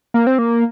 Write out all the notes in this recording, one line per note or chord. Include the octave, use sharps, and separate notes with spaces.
A#3
C4
A#3